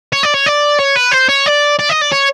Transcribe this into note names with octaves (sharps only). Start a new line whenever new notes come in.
C#5
D5
C#5
D5
C#5
B4
C5
C#5
D5
D5
D#5
D5
C#5